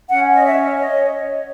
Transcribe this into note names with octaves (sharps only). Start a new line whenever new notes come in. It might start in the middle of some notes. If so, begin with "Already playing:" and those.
C#4 F#5
D#5
C#5 E5
C#5 D#5
C#5